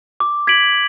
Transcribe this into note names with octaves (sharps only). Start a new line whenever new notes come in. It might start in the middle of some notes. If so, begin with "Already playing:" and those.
D6
G#6 B6 D7 F#7